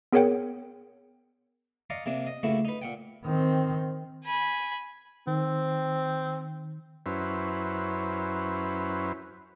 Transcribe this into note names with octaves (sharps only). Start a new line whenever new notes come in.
B3 G#4 A#4 C#5 F#5 G5
D5 D#5 F5 A#5 C#6
C3 A#3 D4
D#5
C#2 A3 A#3 E4 F#4
D#4 B4
A#2 F#5 G5
D#3 C4
G#5 B5
D#3 C4
F#2 C#4 E4 B4 C5